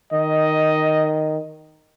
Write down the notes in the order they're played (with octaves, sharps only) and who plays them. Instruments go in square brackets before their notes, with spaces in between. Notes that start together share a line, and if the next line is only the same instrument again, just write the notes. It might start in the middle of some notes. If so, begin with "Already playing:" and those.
[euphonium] D#3 [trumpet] D#5